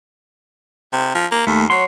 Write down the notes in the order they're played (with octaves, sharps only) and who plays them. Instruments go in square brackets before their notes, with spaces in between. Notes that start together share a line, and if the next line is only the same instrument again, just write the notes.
[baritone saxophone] C3
F3
A#3
[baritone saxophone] D#2 [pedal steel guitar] A3
[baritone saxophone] F#3 [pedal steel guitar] C#5 C6